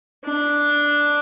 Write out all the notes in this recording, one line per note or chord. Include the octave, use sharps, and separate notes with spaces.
D4